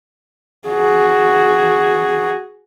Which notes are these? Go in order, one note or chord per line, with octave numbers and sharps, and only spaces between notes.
F#4 G#4